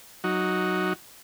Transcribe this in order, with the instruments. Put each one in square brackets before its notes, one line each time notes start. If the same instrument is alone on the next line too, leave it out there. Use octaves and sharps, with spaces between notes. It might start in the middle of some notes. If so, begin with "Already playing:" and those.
[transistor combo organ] F#3 D#4 F#4